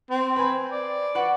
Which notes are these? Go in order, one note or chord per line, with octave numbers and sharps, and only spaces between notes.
C4
B4 G#5 B5
D5
F#4 B4 F#5